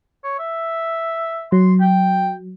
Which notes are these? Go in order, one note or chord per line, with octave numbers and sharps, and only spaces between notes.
C#5
E5
F#3 C6
G5